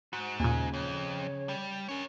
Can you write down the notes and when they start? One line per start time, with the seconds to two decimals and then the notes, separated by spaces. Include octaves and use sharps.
0.13 G#2 F#4
0.40 D#2 A#2 C#3 G#5
0.74 F2 C#5
1.49 G3
1.89 C#4 A#4 C#5